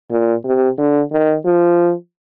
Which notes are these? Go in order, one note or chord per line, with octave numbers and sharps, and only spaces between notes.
A#2
C3
D3
D#3
F3